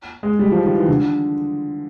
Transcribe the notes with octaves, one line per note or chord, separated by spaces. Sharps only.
G#3
G3
F3
D#3
E3
D3